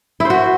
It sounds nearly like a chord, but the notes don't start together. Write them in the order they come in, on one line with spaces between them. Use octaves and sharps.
E4 C5 F#4